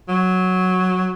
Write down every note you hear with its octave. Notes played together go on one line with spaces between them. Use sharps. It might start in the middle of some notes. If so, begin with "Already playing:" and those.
F#3